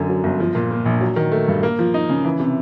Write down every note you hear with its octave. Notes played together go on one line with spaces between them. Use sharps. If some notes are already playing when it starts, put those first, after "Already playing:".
Already playing: F#2 D3
F#3
G1
F3
A#2
A#3
A#1
F#3
D#3
A3
G2
A#3
F3
D#4
C#3
E3
C3